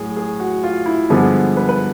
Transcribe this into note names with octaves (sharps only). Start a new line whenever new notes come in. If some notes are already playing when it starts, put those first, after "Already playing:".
Already playing: A2 F#3 G#4
G#4
F#4
F4
E4
G2 D3 F3 G#3 B3 G#4
B4
B4